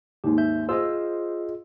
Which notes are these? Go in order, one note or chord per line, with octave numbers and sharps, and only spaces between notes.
D#2 G#2 G4
E5 G6
F4 G#4 C5 D#5 E6